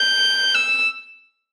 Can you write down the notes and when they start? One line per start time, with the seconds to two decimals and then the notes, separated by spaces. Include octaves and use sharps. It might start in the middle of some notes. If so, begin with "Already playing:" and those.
Already playing: G6
0.55 E6